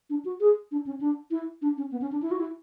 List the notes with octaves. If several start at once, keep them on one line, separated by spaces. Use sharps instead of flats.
D4
F#4
G#4
D4
C#4
D4
E4
D4
C#4
B3
C#4
D4
E4
F#4
E4